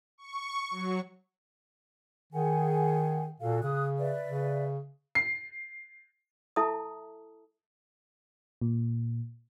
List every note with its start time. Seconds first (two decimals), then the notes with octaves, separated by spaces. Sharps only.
0.18 C#6
0.71 F#3
2.33 D#3 G#4 F#5 G#5
3.41 A#2 F#4 A4 F5
3.63 C#3 D#6 F#6
3.99 B4 D5 E5
4.28 C#3
5.15 C7
6.56 E4 A4 E5 A5 A#5 D#6
8.62 A#2